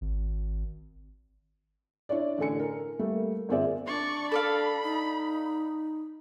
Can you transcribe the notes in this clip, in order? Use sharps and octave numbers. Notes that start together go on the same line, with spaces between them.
G#1
D4 E4 C#5 D5
A1 D3 A4 G#5 C#7
A#4
G3 A3 A#3
G1 A#3 C4 G#4 D5 E5
D4 D5 C#6
A4 D5 F5 B5
D#4